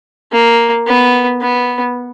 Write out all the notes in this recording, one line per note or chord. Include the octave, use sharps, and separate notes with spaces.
A#3
B3
B3